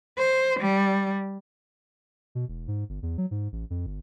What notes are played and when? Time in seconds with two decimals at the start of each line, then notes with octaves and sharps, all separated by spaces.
0.18 C5
0.60 G3
2.35 B2
2.48 E1
2.68 G#2
2.89 G1
3.03 E2
3.18 F#3
3.31 G#2
3.52 A1
3.70 F2
3.86 G1